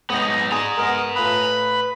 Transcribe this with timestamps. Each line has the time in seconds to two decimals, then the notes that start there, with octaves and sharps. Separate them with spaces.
0.10 G#2 B3 D#4 C#5 D#5
0.52 G#4 D5 G#5 A#5 C#6
0.77 G#3 B3 D#4 A#4
1.15 A2 F4 B4 B5 D#6